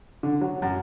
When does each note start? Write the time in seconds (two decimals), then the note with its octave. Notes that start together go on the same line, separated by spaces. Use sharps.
0.23 D3
0.41 F#3
0.62 F#2